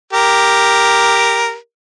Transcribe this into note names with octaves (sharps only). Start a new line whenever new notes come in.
G4 A#4